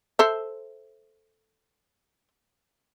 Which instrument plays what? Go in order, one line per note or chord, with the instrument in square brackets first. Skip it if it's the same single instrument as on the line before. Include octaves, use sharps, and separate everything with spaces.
[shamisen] A4 C5 E5